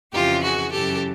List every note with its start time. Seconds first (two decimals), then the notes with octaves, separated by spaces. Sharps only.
0.12 F2 C#3 E3 F4 G4
0.42 F#4 G#4
0.71 F#2 C#3 E3 G4 A4